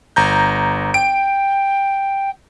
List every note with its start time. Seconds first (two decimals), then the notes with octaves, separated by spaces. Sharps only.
0.16 G1 A#5 G6
0.94 G5 D7